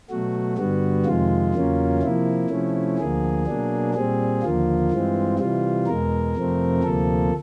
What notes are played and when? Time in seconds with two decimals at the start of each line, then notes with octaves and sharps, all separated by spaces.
0.10 B2 F#3 A3 F#4
0.57 G2 D3 G3 B3 F#4
1.05 F2 C3 D#3 G#3 F4
1.54 E2 C#3 F#3 A#3 C#4
2.02 C3 F3 A#3 E4
2.50 C3 F3 A3 C#4
2.99 D2 D3 F3 A#3 G#4
3.46 B2 F#3 A#3 D4
3.94 A#2 G3 C4 G#4
4.42 D#2 D3 F3 A#3 F4
4.92 G2 E3 G#3 C4
5.39 C3 E3 G3 F4
5.87 E2 B2 G#3 A#4
6.36 F2 C3 F3 A3 C4
6.83 D2 C3 F3 A#3 A4